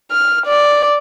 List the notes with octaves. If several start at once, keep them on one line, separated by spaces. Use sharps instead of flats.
F6
D5